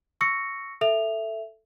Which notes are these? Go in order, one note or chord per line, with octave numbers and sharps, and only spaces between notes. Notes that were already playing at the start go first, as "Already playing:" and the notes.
C#6 E6 A#6 C#7
A4 E5 F7